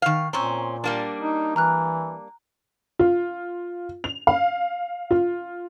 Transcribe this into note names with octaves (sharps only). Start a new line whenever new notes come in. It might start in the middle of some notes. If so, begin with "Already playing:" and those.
D#3 F5
A#2 C4 C#4 A#5 C#6
G3 A#3 D4
D#4
E3 A#5 F6 F#6
F4
F7
F5
F4